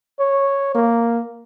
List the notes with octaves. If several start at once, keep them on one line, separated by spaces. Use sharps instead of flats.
C#5
A#3